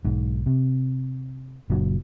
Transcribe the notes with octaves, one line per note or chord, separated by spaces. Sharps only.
B1 G#2
C3
F#1 A#2 F#3